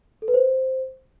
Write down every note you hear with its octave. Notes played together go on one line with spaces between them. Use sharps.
A4
B4
C5